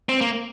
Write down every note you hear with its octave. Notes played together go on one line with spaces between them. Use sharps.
C4
A#3